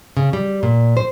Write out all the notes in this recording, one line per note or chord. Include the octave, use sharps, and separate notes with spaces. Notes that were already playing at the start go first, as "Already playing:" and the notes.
C#3
G3
A#2
C5